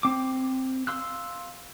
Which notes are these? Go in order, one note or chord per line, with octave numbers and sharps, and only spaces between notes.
C4 D6
F5 C6 E6 F#6